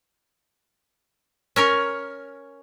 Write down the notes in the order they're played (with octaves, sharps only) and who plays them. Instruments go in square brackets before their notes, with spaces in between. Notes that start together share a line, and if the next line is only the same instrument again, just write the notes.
[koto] C#4 A#4 C#5